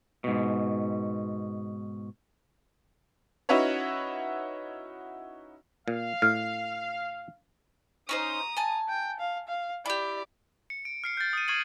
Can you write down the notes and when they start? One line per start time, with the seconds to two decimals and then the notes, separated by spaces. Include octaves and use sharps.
0.24 G#2 B2
3.49 C#4 D#4 E4 F#4 B4 C#5
5.88 A#2 F5
6.22 A2 F6
8.09 C#4 D#4 C5 A#5 D#6
8.57 G#5 A5
8.89 G5
9.20 F5
9.48 F5
9.86 E4 G4 D5
10.70 C#7
10.85 D7
11.04 F6 C7 C#7
11.17 G6 A6
11.33 D#6 D#7
11.48 C#6 F6 G#6 C7 D#7 F#7